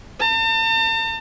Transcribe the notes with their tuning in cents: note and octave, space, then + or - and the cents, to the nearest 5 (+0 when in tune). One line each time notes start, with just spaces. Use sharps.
A5 +45